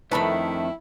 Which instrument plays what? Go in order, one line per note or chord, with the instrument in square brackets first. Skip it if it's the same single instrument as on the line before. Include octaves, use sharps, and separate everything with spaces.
[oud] F2 D4 [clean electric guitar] D#3 A3 [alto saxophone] E4 [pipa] B4 A5 B5